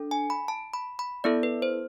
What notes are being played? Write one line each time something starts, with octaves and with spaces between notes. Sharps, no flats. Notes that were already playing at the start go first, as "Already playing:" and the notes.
Already playing: D4 A4
G#5
B5
A5
B5
B5
B3 E4 A4 D5
B4
C5